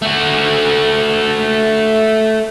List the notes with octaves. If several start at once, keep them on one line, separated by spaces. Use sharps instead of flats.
A3 F#4